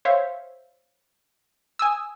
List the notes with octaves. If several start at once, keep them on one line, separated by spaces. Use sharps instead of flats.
C5 C#5 E5 F5
G#5 D#6 E6